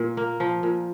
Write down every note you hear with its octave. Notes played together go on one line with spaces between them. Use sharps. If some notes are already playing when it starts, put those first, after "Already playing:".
Already playing: A#2
A#3
F3
A#2